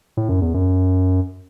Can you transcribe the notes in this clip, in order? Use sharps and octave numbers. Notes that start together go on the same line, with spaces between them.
A2
F#2
E2
F#2